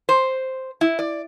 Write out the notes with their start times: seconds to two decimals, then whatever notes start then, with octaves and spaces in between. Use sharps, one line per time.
0.09 C5
0.81 E4
0.99 D5